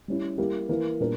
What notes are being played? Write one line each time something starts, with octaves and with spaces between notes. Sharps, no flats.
G3 C#4 E4
G3 A#3 E4 G4
E3 A#3 E4 B4
A#2 G3 B3 D4 A#4